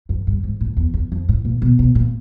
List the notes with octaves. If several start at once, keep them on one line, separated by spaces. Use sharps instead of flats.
F#2
G2
G#2
A2
E2
E2
F2
A2
A#2
B2
B2
A#2